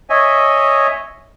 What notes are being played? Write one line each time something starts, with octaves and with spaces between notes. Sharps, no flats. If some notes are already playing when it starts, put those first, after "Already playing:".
C#5 D#5 E5 G#5